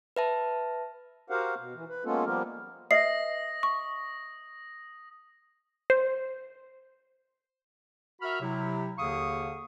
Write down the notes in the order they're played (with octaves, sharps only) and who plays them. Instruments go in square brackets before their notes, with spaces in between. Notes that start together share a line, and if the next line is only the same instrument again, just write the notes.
[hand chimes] B4 E5 A5
[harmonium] F#4 G4 A#4 C5 F5 F#5
B2
E3
B4
G#3 A#3 B3 C#4 F4 A4
F3 G3 A#3 B3 G4 A#4
[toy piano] B4 D#5 E5 [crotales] D#6 A#6 [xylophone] C7
[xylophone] C#6
[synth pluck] C5
[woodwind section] F#4 A#4 E5 B5 F6
C3 F#3 E4
D#2 D3 G#4 F5 C#6 D#6